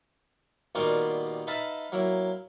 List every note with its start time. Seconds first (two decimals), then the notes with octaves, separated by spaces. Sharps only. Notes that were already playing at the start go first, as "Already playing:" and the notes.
0.75 A#2 D#3 G3 A#3 B3 F#4
1.47 D#4 B4 E5 F5 A5 B5
1.92 F#3 A#3 E4